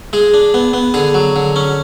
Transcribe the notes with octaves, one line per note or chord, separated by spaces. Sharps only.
G#3 G#4
D4
B3
B3
D3 G#4
F#3
D3
C#4